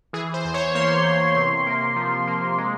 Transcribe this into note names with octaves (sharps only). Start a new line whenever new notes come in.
E3 G#4
C5
E2 C5
C#5
A#3 C6
E2
C3
A#3
F3
A#3
G#3